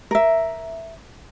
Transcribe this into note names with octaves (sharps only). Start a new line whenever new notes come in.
A#4 E5